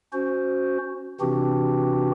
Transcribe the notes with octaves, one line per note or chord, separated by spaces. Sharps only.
C#4 F#4 C5
C3 E3 C4 D4 F#4 G4